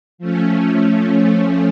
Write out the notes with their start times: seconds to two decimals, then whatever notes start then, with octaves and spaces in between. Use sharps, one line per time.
0.18 F3 A3 C#4